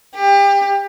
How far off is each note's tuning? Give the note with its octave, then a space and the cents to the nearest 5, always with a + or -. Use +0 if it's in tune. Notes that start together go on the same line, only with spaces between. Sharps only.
G4 +30